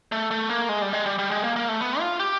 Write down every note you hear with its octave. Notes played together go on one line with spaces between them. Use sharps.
A3
A3
A#3
G#3
G3
G#3
G3
G3
G#3
A#3
A#3
A3
B3
F4
G4